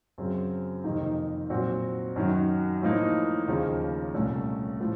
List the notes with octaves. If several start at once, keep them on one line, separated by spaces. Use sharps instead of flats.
F#2 C#3 F#3 C4
F2 C3 D#3 A#3 D#4
A#2 F#3 C4 F#4
F#2 D#3 F#3
A2 F3 A#3 D#4
D#2 C#3 F3 A#3
C2 A#2 A3 C#4
A2 F3